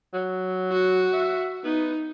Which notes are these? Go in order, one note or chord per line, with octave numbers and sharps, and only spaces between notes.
F#3
F#4
E5
B3 D#4